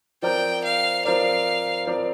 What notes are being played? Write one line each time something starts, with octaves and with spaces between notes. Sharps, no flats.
F3 C4 A#4 D5 G5
F5
F3 C4 A#4 D5 F5
F3 C4 A#4 D5